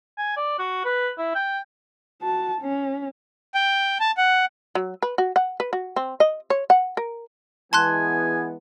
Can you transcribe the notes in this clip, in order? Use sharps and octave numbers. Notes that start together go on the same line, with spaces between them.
G#5
D5
F#4
B4
E4
G5
F#4 A5
C#4
G5
A5
F#5
F#3
B4
F#4
F#5
B4
F#4
C4
D#5
C#5
F#5
A#4
E3 G#3 B3 G#5 A5 C6 F#6